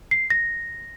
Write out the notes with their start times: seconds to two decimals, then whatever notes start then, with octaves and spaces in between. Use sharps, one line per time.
0.11 C7
0.30 A#6